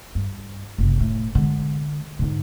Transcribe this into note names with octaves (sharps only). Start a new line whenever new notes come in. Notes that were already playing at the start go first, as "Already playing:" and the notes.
G2
F#1 C3
A2
D3 G#3
G#2 D3